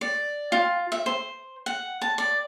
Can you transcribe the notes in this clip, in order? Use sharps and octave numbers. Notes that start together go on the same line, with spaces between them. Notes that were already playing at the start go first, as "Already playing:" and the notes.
D5
F4
E5
C5
F#5
A5
D5